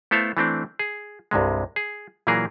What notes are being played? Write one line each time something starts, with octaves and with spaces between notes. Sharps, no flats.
A3 B3 E4 A4 C5 F5
E3 A3 C4 D4
G#4
C2 G2 C3 G#3
G#4
A#2 E3 F#3 A#3 G#4 A#4